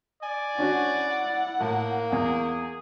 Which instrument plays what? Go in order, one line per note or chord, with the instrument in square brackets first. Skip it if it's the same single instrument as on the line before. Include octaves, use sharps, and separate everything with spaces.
[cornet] D5 [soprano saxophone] G#5
[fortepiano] C#4 D4 F#4 [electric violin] E4 F#5
[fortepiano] A2 [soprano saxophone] A#3
[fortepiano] E2 [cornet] G#4